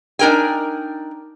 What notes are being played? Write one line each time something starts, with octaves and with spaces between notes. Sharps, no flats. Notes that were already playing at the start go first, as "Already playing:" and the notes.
D4 D#4 A#4 G5 G#5